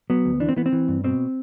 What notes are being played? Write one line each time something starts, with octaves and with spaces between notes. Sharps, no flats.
F#3 B3
D2
E3 D4
C4
E3 B3
C4
E3
G2
B2 C4